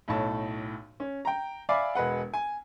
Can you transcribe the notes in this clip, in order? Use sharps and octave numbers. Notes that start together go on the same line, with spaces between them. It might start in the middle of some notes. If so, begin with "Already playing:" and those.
B1 A2 C#5 A5
C#4
G5 A#5
D5 E5 F5 G#5 B5 D6
E1 G#3 B4 F#5
G#5